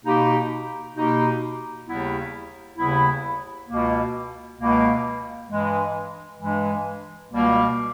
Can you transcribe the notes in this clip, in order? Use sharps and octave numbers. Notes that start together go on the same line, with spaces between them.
B2 A#3 D#4 G4
B2 A#3 D#4 G4
D#2 C#3 G3 B3 E4
D#2 C#3 G3 B3 E4
C#2 B2 A#3
C#2 B2 A#3
G2 E3 G#3
G2 E3 G#3
C#2 B2 G3 A#3